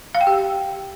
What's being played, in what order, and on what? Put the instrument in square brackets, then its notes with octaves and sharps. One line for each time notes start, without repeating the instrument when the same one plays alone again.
[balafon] F5
G5
G4